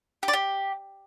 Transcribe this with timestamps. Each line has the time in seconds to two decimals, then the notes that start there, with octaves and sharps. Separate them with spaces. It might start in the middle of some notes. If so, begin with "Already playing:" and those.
0.23 G4
0.28 D5
0.33 G4